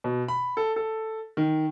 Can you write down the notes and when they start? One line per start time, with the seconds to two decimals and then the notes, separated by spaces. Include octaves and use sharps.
0.04 B2
0.28 B5
0.57 A4
0.76 A4
1.37 D#3